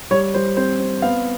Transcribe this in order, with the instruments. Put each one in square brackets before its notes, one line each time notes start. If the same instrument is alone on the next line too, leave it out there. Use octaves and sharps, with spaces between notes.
[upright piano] G3 C#5
G3 C5
C4 C5
C4
B3 F5